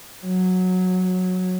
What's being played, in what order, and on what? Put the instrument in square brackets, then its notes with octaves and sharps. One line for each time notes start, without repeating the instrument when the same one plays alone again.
[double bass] F#3